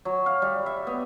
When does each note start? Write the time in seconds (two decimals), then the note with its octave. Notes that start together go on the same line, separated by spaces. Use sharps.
0.05 F#3
0.26 F5
0.42 G3
0.66 E5
0.87 B3